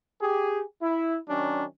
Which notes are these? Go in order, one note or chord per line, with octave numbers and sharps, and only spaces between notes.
G4 G#4
E4
D#3 F#3 C#4 D4